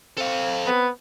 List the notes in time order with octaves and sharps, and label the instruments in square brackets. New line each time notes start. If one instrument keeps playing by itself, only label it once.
[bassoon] C4 [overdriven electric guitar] A4 F5
[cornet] B3 [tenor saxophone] B4